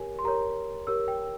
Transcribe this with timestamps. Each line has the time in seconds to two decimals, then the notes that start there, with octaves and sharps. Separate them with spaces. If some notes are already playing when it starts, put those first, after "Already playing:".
Already playing: G4 A#4 C#5 G#5
0.19 C6
0.24 G4 A#4 C#5 A#5
0.87 G4 A#4 C#5 E6
1.08 G5